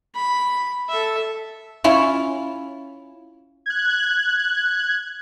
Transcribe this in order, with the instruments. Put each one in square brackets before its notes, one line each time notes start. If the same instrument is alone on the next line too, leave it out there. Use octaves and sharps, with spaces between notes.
[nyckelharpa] B5
A4 E5
[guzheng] C#4 E4 F4
[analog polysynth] F#6 G#6